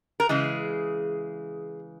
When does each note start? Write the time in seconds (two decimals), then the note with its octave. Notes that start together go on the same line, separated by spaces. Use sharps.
0.20 A#4
0.29 C#3 E3 G#3 G#4